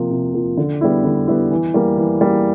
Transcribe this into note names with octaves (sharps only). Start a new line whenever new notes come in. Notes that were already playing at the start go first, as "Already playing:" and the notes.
Already playing: C3 F3 A#3
C3
F3 A#3
D3
G3 B3 E4
D3
G3 B3 E4
E3
G3 A#3
E3
G3 A#3